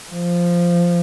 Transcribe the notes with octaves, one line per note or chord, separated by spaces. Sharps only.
F3